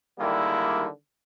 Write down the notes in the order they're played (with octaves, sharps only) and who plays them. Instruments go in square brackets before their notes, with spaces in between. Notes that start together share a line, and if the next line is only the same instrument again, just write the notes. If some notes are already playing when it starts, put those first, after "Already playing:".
[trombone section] D3 D#3 G3 G#3 A#3 E4